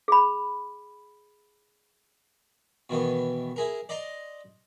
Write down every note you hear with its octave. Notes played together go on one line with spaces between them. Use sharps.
G#4 B5
B2 D#3 E3 B3
E4 G#4 A#4
D5 D#5 A#5 C6